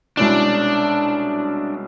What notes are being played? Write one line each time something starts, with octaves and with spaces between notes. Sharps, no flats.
C2 B2 G#3 C#4 D4 E4